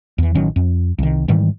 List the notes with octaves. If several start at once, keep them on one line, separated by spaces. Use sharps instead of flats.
E2 E3
A1 D#3 F#3 C#4
F2
C2 D#3
G#2 D#3 E3 G3